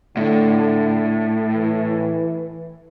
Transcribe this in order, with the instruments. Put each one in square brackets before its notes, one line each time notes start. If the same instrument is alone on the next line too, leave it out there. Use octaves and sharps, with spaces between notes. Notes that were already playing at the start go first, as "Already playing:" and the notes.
[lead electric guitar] A2 [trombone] D3
[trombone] E3